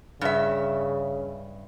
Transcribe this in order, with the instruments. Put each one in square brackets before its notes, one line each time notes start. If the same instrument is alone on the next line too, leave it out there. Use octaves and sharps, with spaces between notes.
[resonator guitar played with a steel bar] G2 E5 [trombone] C#3